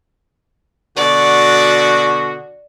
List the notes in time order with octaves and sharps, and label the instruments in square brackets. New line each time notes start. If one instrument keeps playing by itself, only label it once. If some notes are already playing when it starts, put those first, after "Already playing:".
[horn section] B2 D3 F#4 [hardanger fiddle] D5